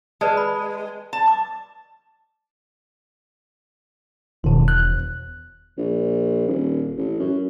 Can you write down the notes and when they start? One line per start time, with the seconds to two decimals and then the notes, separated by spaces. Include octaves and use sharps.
0.21 G#3 B4 D5 A5
0.37 B5
1.13 A5
1.28 D6
4.44 E1 B2 D#3
4.68 F#6
5.78 A#1
6.47 D#1
6.97 A1
7.19 F#2